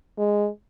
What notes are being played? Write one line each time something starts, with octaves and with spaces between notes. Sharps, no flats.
G#3